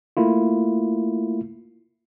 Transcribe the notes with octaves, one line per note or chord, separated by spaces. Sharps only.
A3 A#3 E4 F4